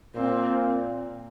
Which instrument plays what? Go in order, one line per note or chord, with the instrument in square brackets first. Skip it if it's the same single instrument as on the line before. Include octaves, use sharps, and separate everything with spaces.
[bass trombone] A#2 [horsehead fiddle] C4